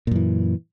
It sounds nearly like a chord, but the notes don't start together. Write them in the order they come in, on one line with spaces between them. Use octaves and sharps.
A#2 F#2 E3